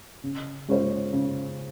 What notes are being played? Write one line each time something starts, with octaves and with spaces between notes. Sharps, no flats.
C#3
G#3 C#4 F4 C5
C#3